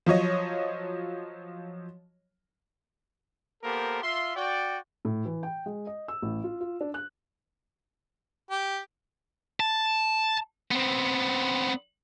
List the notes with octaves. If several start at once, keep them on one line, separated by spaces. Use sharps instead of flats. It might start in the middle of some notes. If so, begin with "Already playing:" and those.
F3 F#3 C#5 D#5
A#3 B3 G4 A4 A#4 C5
F4 E5 C6
F#4 D5 G5
A2
E3
G5
G#3
D#5
E6
A1
F4
F4
D4
F#6
G4
A5
B3 C4